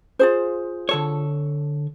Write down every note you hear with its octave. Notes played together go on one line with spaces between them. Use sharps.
F4 G#4 C5
D3 A4 C#5